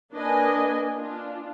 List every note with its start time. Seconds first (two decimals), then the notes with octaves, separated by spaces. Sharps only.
0.13 A#3 D4 B4 D5 D#5 G#5
0.95 D4 F4